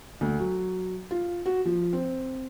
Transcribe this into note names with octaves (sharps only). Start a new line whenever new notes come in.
D2
F#3
F4
F#4
F3
C4